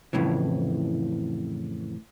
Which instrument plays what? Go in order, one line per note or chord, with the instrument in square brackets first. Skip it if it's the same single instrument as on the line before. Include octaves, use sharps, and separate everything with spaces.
[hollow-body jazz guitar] F2 A2 C#3 E3